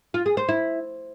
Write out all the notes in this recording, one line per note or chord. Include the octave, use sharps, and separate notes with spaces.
F4
G#4
C5
E4